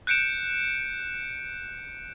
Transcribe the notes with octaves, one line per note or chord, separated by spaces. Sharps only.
F#6 G6 C#7 D7 E7